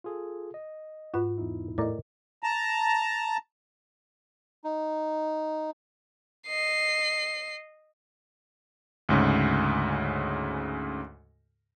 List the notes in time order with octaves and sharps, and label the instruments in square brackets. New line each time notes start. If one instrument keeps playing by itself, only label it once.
[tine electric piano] F4 G#4 A4
D#5
[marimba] G#2 F4 [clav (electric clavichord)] F#4 B4
[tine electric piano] E2 D#4 E4
[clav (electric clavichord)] A2 D5 A#5 [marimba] A#4 D#5
[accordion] A5 A#5
[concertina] D#4
[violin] D#5 C7
[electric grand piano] D2 G#2 C#3